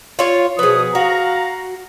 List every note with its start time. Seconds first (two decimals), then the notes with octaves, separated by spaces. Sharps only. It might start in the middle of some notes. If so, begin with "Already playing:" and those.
0.19 F4 C#5
0.59 B2 F3 B3 G#4 D#6
0.95 F#4 F5 A#5